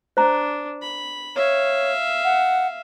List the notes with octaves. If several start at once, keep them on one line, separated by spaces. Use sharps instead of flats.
D4 C5 A#5
B5
C#5 E5 F5
F#5